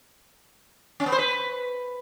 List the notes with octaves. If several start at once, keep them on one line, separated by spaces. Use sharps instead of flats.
C#4
B3
C5
B4